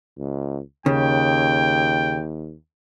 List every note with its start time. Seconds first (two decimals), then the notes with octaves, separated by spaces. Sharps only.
0.18 C#2
0.86 D#2 C#3 G5